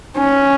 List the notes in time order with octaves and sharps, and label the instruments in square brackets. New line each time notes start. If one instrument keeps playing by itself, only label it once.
[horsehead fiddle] C#4